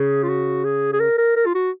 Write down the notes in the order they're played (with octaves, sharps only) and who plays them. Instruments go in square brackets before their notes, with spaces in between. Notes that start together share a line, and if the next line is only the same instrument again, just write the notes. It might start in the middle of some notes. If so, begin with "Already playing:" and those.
Already playing: [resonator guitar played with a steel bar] C#3 [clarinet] G#4
[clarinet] F4
F#4
G#4
G#4
A#4
A#4
A#4
F4
F#4